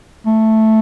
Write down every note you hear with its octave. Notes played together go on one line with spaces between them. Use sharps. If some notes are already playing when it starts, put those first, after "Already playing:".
A3